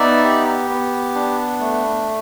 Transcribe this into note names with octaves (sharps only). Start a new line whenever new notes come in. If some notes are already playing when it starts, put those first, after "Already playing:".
Already playing: B3 D#4 D5 E5
G4
B3
D4
A3